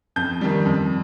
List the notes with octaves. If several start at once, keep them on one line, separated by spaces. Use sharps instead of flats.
F2 G6
D#3 G3
F2